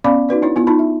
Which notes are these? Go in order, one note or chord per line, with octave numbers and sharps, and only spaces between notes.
B3 C#4 D5 F5 B5 D6
D#4 F#4 B4 D5
D4 E4 C#5
B3 E4 F4
D#4 F4 A5 B5
E5